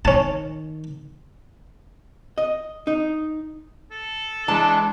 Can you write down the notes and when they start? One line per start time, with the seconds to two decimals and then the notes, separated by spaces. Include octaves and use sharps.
0.05 D#3 C#4 A5
2.38 D#5
2.87 D#4
3.91 A4
4.48 E3 G#3 D4 A5